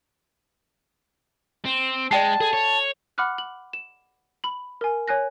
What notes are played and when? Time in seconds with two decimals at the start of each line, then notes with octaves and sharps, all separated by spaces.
1.65 C4
2.11 G#3 D5 G5 A5 C7
2.41 G#4 A4
2.53 C#5
3.18 F#5 B5 D6 F6 F#6
3.38 F#7
3.73 E7
4.44 B5 F#7
4.81 A#4 G#5
5.08 C#5 G#5 F#6 A#6